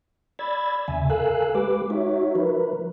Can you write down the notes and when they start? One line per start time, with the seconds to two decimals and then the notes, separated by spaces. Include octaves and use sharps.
0.39 D5 B5 E6 G#6 A6
0.88 D#2 C#3 E5 G#5
1.10 A4 A#4 F5 G#5 E6 F#6
1.55 G#3 G4 B4 D6
1.90 D#4 F#4 C#5 E5
2.35 F3 A#4 B4